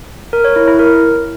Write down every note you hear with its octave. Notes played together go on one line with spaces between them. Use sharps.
A#4
C#5
E4
E4
A#4